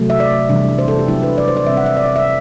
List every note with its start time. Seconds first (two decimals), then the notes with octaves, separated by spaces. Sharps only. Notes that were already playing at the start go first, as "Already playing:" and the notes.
Already playing: C3 F#3 A3
0.10 E5
0.20 D5
0.49 C3 E3 G3 D4
0.79 C5
0.88 A4
0.99 G4
1.08 F#3 B3 D4 E4
1.23 B4
1.38 D5
1.48 C5
1.57 D5
1.67 C3 G3 C4 E5
1.77 F#5
1.86 E5
1.97 D5
2.06 E5
2.16 E5